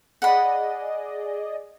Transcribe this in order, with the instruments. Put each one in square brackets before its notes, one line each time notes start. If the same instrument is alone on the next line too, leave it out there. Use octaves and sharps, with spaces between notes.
[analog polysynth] G#4 D5 D#5 [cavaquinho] F#5 B5